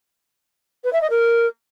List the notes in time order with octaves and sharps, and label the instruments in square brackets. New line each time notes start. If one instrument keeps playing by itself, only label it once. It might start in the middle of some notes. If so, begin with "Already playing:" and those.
[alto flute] B4
E5
D#5
A#4